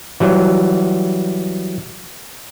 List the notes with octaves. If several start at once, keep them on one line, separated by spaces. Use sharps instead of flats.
E3 F#3 G3